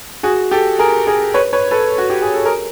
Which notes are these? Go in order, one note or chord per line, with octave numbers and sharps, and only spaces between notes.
F#4 G#4
G4 A4
G#4 A#4
G#4 A#4
B4 C#5
B4 C#5
A4 B4
F#4
G4
G#4
A4
G#4 A#4